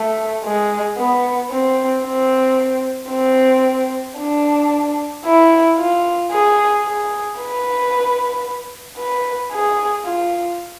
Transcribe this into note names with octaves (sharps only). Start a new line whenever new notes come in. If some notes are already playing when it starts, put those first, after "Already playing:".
Already playing: A3
G#3
B3
C4
C4
C4
D4
E4
F4
G#4
G#4
B4
B4
G#4
F4